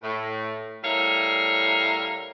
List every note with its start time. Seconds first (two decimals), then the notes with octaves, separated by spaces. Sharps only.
0.03 A2
0.84 A2 G3 E4 A#4 C#5 F5